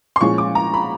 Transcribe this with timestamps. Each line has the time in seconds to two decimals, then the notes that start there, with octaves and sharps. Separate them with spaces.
0.16 C6
0.21 A#2 F3 G#3 C#4 C#6
0.38 D6
0.55 A#5
0.74 B5